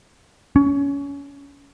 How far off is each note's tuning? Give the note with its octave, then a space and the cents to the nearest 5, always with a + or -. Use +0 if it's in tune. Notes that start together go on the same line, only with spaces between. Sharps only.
C#4 +20